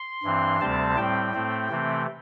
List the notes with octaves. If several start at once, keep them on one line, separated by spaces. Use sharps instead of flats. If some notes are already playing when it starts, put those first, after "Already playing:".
Already playing: C6
G2 E3 C4
D2 C3 G3 C4 A5
A2 G3 C4 G5
A2 A3 C4
C3 E3 A3 C4